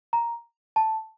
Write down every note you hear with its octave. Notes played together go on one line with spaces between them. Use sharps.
A#5
A5